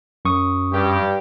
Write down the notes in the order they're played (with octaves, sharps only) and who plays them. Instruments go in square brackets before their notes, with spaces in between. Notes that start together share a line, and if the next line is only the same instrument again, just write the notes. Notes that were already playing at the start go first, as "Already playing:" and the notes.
[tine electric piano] F#2 C#6 D#6
[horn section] G2 G4